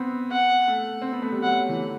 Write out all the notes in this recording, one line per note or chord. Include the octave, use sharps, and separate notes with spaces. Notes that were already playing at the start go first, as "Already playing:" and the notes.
Already playing: B3 C4
F#5
A3
C4
B3
A3
G3
F#3 F#5
E3
D3